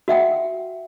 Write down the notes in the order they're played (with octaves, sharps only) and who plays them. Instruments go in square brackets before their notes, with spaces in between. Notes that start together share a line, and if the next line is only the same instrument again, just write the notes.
[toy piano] F#4 E5 F#5 G5